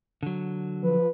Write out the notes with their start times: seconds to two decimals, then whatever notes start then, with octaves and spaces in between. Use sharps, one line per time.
0.23 D3 F#3
0.84 F3 B4